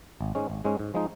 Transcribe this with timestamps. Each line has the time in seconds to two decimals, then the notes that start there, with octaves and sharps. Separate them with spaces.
0.21 G#1
0.35 G#2 G#3 C#4
0.50 G#1
0.65 G#2 G#3 C#4
0.79 G#2
0.94 F3 G#3 D#4